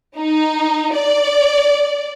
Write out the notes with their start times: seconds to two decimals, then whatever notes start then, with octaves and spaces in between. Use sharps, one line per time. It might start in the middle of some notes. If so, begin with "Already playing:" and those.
0.17 D#4
0.95 D5